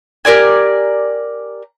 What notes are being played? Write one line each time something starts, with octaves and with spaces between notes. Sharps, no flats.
G4 A#4 D5 G#5